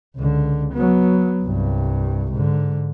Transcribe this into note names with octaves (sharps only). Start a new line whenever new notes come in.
C#2 D3
F#3 B3
C2 G2
G#2 D3